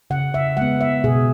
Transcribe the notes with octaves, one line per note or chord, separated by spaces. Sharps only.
C#3 F#5
E5
G#3 B3 F#5
E5
B2 G#4